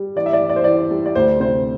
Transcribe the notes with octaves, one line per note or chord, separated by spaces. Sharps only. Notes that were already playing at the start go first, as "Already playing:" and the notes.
Already playing: G3
E3 D5
E5
D5
E3
D5
C5
E3 D5
G3
D5
D2 C5
C3 C5